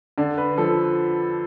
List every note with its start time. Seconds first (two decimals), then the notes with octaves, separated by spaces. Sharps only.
0.18 D3 D5
0.38 B4
0.58 F3 A4